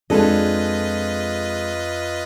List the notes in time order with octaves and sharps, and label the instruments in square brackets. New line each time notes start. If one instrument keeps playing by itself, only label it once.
[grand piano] F2 [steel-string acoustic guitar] G#3 [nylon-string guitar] D4 A4 [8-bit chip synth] F4 B4 D#5